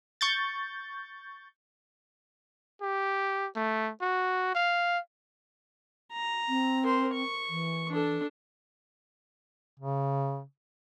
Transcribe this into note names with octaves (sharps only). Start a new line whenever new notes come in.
C#6 G6 A6
G4
A3
F#4
F5
A#5
C4
A#4 C5
C#6
E3
D4 A4
C#3